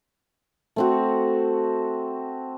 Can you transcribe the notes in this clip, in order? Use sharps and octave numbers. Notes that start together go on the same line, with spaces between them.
A3 C4 F#4